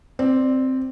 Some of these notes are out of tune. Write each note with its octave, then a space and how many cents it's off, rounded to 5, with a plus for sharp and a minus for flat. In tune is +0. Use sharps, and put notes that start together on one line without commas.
C4 +0 D5 +10